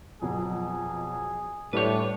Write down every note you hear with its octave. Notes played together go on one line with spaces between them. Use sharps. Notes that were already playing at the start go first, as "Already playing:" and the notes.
F2 B2 F#3 G#4
A2 G3 D4 B4 C#5 G6